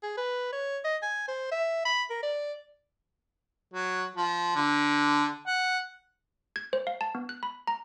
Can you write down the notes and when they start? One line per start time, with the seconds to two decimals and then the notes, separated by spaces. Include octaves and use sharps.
0.03 G#4
0.17 B4
0.52 C#5
0.84 D#5
1.02 G#5
1.28 C5
1.52 E5
1.85 B5
2.10 A#4
2.23 D5
3.73 F#3
4.16 F3
4.55 D3
5.47 F#5
6.56 G#6
6.73 C5
6.87 F5
7.01 A5
7.15 B3
7.29 F#6
7.43 B5
7.67 A#5